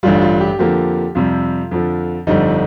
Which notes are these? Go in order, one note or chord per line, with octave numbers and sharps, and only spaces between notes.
A1 G2 D3 G3 F4
F4
G4
F2 D3 F3 A#3 G4
F2 C3 G3 F4
F2 D3 F3
G1 F2 D3 G3 D#4